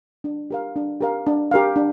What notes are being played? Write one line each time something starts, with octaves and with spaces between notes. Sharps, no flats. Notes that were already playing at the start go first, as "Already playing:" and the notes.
D4
G4 A#4 F5
D4
G4 A#4 F5
D4
G4 A#4 F5
D4